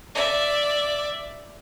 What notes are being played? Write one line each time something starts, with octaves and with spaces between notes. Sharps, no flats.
D5 E5